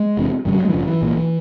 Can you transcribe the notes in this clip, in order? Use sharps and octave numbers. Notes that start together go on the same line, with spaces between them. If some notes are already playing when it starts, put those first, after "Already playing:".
Already playing: G#3
F1 E2 C3
G#1 F#2 C#3 G3
F#3
G#3
E3
G#1 F#2 C#3 F3
E3
B1 A#2